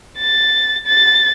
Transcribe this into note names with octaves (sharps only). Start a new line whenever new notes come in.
A6
A6